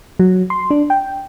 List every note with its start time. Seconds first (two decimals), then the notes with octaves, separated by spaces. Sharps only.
0.19 F#3
0.50 C6
0.70 D4
0.90 G5